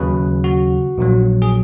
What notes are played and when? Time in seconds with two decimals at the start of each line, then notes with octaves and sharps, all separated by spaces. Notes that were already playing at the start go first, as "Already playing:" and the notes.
Already playing: D#2 C#3 F#3 B4
0.44 F#4
0.98 A#1 A#2 F#3
1.42 G#4